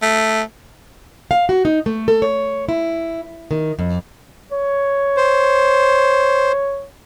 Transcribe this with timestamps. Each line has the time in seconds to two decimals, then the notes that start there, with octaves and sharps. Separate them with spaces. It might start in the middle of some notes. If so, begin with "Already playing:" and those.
0.02 A3
1.31 F5
1.49 F#4
1.65 D#4
1.86 A3
2.08 A4
2.22 C#5
2.69 E4
3.51 D#3
3.79 F2
4.52 C#5
5.17 C5